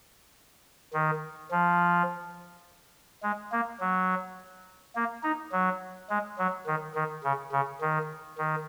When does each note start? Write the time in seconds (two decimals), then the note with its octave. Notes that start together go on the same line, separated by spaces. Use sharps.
0.94 D#3
1.51 F3
3.23 G#3
3.52 A#3
3.80 F#3
4.96 A#3
5.23 D#4
5.52 F#3
6.09 G#3
6.38 F#3
6.67 D#3
6.95 D#3
7.24 C#3
7.52 C#3
7.81 D#3
8.38 D#3